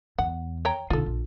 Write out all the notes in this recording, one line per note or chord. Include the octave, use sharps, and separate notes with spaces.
E2 F#5
C#5 G5 A#5
B1 D3 F4 A4
A#1